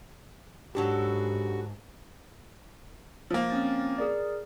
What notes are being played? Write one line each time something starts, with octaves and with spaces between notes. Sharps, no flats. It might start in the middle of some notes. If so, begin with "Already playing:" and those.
G#2 F#3 D4 F#4 G4 A4 B4
F3 A#3
C4 C#4 A6
G#4 A#4 D5